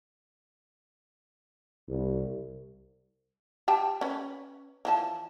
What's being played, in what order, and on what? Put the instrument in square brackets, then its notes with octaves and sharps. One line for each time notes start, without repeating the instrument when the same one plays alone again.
[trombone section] C2
[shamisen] G4 G5 A5
C#4 B4
E3 F3 A5